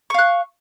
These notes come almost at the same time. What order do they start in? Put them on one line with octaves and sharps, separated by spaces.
C#6 F5 F#6